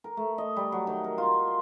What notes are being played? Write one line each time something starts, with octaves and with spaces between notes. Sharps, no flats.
A#4
A3
D#5
G3
F#3
D#3
A#4
F4
C6